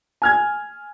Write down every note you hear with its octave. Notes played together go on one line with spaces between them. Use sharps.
G#5 F6 G#6